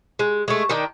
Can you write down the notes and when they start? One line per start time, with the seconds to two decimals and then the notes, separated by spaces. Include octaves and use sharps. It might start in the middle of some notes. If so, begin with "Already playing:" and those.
0.19 G#3
0.48 G#3 A3
0.69 D#3 D4 D#4 G5